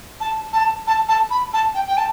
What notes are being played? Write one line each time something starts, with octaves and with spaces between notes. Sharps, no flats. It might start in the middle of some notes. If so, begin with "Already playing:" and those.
A5
A5
A5
A5
B5
A5
G5
G5
A5